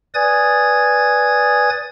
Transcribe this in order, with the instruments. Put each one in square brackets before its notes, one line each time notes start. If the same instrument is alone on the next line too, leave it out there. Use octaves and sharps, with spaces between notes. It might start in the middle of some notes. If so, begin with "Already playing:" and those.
[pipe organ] B4 D5 G#5 D#6 G#6 A6